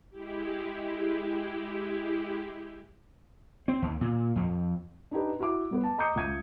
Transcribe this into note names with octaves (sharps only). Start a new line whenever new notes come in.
G#3 E4 G4
C4
D#2
A#2
F2
D4 D#4 G4 B4
E4 F#4 E5 D6
G3 B3 B4
A5
D#5 A#5 D6 D#6 G6 C#7
C#2 E5 G#6 D#7